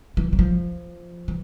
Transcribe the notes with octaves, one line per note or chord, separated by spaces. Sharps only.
E3
F#3
F3
E3